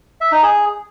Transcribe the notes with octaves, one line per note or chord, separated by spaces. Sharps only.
E5
D#4
G#4